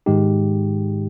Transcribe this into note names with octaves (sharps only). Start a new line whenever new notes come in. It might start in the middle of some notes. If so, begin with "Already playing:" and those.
G#2 D#3 G#3 D#4 G4